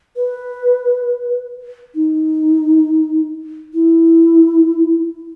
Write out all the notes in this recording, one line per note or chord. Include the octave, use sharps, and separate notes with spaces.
B4
D#4
E4